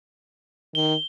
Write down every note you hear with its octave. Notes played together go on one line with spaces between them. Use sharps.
D#3 G7